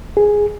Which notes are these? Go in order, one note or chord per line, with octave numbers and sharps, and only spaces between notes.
G#4